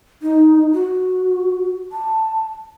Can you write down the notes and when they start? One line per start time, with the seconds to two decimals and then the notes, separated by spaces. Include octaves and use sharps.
0.22 D#4
0.73 F#4
1.92 A5